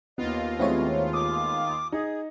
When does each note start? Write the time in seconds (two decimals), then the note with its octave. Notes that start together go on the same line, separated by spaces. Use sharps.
0.18 D#2 B3 F4 D#5
0.59 G#3 A3 B3 C4 E4 C#5
1.13 D6 D#6
1.92 D#4 G#4